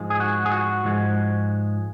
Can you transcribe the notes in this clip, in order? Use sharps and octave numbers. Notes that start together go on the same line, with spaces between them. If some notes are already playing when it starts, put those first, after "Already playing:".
Already playing: G#2 F3 G#3
G#4
F#4
G#4
F#4
G#2 F3 G#3